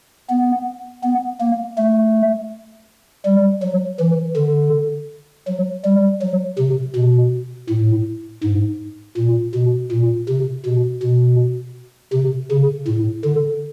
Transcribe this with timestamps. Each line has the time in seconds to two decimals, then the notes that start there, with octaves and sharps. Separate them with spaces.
0.30 B3
1.03 B3
1.40 A#3
1.78 A3
3.25 G3
3.62 F#3
4.00 E3
4.36 D3
5.47 F#3
5.85 G3
6.22 F#3
6.59 C3
6.95 B2
7.69 A2
8.44 G#2
9.17 A#2
9.54 B2
9.91 A#2
10.29 C3
10.65 B2
11.02 B2
12.13 C3
12.51 C#3
12.88 A2
13.25 D3